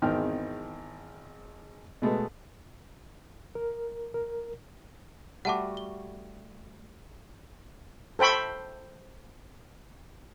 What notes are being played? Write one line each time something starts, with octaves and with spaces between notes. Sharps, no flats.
G#1 E2 D#3 C4 G5 F6
B2 G#3 A3 B3
A#4
A#4
G3 A3 F#4 F#5 A5 D6
G7
A4 C5 G5 B5 C#6